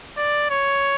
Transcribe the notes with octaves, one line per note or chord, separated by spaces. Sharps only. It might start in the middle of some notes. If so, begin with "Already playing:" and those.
D5
C#5